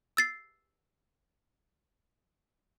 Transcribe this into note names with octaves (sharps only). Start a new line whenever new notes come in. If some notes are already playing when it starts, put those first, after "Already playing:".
E6 A6 C7